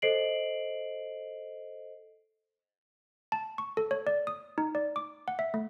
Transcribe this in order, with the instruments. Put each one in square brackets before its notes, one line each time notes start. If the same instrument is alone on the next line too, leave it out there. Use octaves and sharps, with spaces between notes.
[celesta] A4 C5 D#5 C7 D7 F#7
[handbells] A5
C#6
A4
C#5
D5
D#6
D#4
D5
D6
F#5
E5
A3